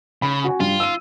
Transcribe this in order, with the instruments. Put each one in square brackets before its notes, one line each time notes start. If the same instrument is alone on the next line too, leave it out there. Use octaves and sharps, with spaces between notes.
[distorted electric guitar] C#3 [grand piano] B5
[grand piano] F#4 G#5
[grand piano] G2 [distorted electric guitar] F4
[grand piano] E6 D#7